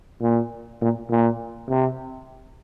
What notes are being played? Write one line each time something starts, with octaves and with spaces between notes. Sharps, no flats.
A#2
A#2
A#2
C3